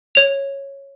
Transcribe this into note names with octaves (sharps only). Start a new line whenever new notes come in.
C#5 F7